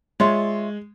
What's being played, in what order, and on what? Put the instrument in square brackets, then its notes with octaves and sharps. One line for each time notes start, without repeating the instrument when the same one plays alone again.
[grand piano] G#3 [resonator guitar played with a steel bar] F4 C#5 E5